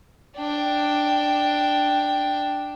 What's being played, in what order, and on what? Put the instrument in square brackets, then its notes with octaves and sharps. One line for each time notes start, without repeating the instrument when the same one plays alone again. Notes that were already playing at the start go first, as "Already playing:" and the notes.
[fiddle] D4 G5